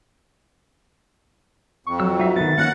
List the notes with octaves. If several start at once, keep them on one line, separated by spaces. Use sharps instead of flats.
F2 C#6
F#3 E6
D#4 F#4 E5
D#3 B3 A6
A#3 C#4 F#4 F#5